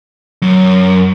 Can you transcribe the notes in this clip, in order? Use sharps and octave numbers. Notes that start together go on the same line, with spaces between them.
F#2